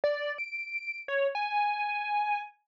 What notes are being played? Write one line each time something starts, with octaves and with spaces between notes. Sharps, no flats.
D5
D7
C#5
G#5